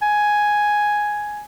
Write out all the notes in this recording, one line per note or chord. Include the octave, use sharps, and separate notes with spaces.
G#5